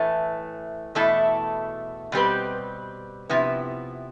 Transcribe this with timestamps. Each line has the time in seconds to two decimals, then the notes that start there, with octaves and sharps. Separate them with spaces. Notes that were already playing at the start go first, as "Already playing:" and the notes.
Already playing: A2 E3 A3
0.95 E2 B2 A3 E4 A4
2.12 B2 G3 C4 G4 B4
3.29 C3 F3 B3 E4